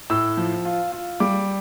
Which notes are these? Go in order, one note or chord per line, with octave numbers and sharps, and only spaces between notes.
A2 E6
F3
F4
F4
G3 D6